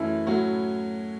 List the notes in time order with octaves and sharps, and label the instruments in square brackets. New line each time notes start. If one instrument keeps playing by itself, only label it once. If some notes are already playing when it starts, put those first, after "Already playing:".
Already playing: [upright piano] F#2 E3 A3 C#4 [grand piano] E4
[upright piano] A2 F#3 C#4 F#4